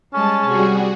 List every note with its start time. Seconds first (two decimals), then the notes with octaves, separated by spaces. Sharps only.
0.14 G3 G#3 C#4 A5
0.46 C3 G3 F#4 G#4